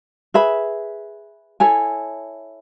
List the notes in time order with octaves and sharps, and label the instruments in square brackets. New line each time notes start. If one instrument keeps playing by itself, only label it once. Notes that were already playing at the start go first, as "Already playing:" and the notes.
[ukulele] G#4 B4 E5 B5
E4 A4 C#5 G#5